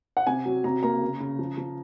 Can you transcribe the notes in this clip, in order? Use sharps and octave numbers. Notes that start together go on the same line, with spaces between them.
F#5
C3 G#5
F#3
C3 A#5
A#3 A#5
C#3
C#3
F3
F3